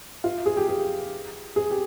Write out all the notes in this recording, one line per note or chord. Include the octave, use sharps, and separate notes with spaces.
F4
G#4
G4
G#4
G#4
G4